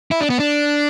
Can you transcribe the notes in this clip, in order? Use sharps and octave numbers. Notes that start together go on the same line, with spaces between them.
E4
D4
B3
D4